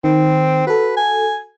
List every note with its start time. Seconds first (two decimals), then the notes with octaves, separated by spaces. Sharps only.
0.04 D#3 C4
0.67 F#4 A4 B4
0.97 G#5